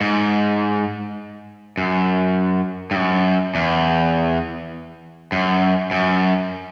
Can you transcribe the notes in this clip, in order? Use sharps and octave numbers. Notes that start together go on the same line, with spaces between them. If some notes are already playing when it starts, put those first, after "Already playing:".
G#2
F#2
G2
F#2
E2
F#2
F#2